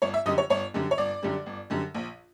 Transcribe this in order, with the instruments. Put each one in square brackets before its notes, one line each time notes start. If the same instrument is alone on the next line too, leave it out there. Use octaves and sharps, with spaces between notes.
[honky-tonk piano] G1 C#5
E5
F#2 D3 G3 D#5
C#5
G1 C#5
F#2 D3 G3
C#5
G1 D5
F#2 D3 G3
G1
F#2 D3 G3
A#1